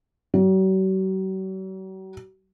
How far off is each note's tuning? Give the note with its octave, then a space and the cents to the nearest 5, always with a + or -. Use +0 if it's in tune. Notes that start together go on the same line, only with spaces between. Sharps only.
F#3 +45